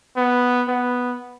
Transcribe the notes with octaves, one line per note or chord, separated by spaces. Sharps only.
B3
B3